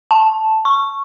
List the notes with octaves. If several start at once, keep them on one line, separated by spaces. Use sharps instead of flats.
A5
C#6